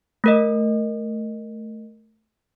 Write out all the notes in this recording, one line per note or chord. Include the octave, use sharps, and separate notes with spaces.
A3 A#4 D#5